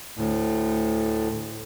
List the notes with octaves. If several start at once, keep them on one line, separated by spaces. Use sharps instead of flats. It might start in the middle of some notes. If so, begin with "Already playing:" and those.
D2 A2